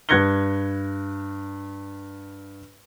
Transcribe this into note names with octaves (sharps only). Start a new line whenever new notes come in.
G2 F#6 G#6 A#6 C#7 G7